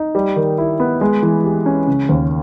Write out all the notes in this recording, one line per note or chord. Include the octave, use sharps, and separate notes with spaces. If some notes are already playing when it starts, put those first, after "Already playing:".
Already playing: D#4
G3
D#3
E4
B3
G#3
E3
G4
C#4
C#3
D#2